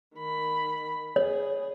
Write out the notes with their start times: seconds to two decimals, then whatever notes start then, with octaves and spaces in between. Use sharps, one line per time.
0.16 D#3 B5
1.16 G#4 C#5